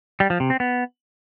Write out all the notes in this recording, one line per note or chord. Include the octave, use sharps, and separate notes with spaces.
G3
F3
C3
C4
B3